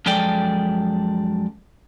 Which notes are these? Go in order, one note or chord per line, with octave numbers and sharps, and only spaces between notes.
F#2 F3 G#3 A4 D5 G5